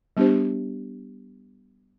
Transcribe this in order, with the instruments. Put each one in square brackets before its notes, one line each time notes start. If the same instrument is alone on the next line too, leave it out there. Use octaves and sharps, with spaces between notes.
[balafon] G3 B3 D4 G4 C5